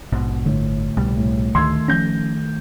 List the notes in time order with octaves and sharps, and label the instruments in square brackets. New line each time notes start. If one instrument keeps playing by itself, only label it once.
[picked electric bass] A#1 G#2 B2
[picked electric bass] G1 [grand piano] A2 [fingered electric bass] D3
[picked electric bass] C2 B2 G3
[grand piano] A2
[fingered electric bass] D2 [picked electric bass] D#3 A3 [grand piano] C6 E6 G#6
[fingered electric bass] F3 C#4 [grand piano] G6 A#6